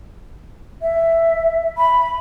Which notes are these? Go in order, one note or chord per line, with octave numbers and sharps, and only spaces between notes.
E5
B5